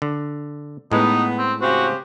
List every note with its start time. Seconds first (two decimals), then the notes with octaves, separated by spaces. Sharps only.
0.02 D3
0.92 A2 G#3 B3 D#4
1.38 C4
1.61 C#3 C4 F#4 G4